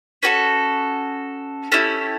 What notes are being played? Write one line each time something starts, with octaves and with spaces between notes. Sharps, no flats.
C#4 F#4 A4 B4
A3 C#4 E4 G4